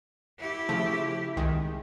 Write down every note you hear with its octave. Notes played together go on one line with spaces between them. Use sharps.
E4 G4
C#3 F3 A3
C2 D#3 G#3